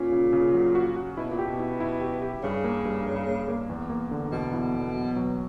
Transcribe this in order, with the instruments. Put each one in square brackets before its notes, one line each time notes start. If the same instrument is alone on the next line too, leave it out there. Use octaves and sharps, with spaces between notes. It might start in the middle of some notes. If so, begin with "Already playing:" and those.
Already playing: [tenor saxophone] A#2 [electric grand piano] C#4
[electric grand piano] C#3
C#3
F#3
F#4
F#4
[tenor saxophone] B2 [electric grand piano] E4
[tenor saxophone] A#2
[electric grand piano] G4
[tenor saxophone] B2
[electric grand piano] E4
E4
G4
G4
[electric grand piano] G2 [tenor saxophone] C#3
[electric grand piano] A#3
G2
G2
A#3
A#3
E2
A#3
D3
[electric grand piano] E2 [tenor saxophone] B2
[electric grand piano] E4
E2
F#3
F#3